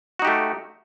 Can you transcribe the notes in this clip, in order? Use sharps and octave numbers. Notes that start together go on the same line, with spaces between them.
A3 D#4 F#4 G4